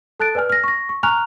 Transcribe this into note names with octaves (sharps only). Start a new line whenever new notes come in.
A4 A5 F#6 A6 D7
B4 D5 G#5 F6
F6 A#6
C#6 A#6
C#6
G#5 A#5 C#6 F6 F#6 F7